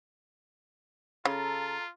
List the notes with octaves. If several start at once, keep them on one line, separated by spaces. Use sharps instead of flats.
C#3 F4 A4 A#5